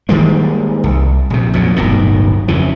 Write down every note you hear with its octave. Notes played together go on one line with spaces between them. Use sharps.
D#3 G3 G#3 A#3
C2
A#1 C3
F2 A#2 F#3
D1 G1 B2 D#3
F2 C#3 E3